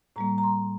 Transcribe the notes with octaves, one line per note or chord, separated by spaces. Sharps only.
A2 G3 A#3 A#5
A#5
C6